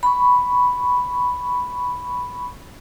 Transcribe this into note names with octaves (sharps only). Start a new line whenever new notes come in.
B5 C#6